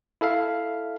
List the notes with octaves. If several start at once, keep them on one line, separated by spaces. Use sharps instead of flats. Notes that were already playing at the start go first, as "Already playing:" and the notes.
E4 A4 E5 F5